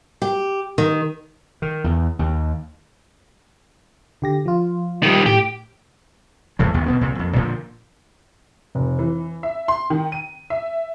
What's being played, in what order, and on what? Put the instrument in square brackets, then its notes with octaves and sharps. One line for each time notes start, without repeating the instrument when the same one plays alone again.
[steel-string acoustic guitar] G4
D#3
[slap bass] D#3
E2
D#2
[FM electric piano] D3 G4 A#6
F3 F4
[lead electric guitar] D#3 G3
[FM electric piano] A2 [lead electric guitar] G4
[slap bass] E2 A2 G#3
F#1 D#2 D#3 B3
B2 B3 C4
C2 A#2 C4
A#1 F2
A#2 D3 F3
[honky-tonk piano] F1
E3
E5
C6
D#3
D#7
E5